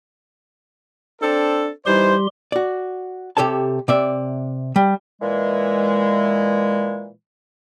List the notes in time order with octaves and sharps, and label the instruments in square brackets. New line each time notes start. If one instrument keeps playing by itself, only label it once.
[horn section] C4 D4 A4
[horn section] E3 D#4 C5 [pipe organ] G3 G4 C6
[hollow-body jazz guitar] F#4 D5
C3 G4 A4 C#5 A5
C3 D5 E5
G3
[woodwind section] A#2 E3 G#3